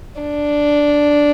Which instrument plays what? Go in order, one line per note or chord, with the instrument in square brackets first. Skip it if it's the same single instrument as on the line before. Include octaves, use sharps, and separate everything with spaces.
[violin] D4